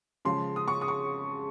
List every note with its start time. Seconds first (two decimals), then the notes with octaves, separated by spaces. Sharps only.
0.25 C#3 F3 G#3 C6
0.56 D#6
0.68 C#6
0.81 D#6
0.88 C#6